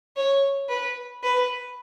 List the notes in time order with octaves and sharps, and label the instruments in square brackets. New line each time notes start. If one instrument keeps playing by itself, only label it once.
[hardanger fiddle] C#5
B4
B4